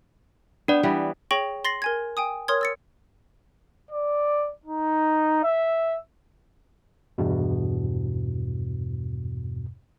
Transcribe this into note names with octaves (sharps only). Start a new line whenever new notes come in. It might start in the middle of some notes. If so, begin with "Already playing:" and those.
B3 D4 D5
E3 G3 B3
G#4 C#5 G5 C#6 A#6 F#7
C6 A6 A#6 C7 F#7
A#4 G#5 G#6
G5 G#5 D#6
A#4 C#5 C6 D#6 F6 G#6
E6 A6 C#7
D5
D#4
E5
E2 G2 B2